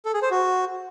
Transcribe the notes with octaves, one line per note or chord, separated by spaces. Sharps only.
A4
G#4
C5
F#4